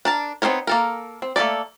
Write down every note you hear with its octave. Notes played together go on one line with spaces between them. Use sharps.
D4 A#4 A5
B3 C4 D#4 A#4 C#5
A#3 A4 A#4
C4
A3 A#3 G#4 A4 D5